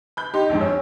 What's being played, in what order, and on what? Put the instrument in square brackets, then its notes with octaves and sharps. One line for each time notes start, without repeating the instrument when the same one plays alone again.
[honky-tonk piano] B5 G6
[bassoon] D#4 [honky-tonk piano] G4 C6
[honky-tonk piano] A#1 F2 G#2
[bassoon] C#4 [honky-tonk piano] E6